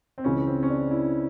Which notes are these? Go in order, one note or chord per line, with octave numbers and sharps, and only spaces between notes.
C4
C#2 C#3 E3 C#4
C4
C#4
D4
E4